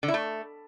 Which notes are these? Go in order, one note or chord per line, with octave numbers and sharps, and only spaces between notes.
D3
E4
A3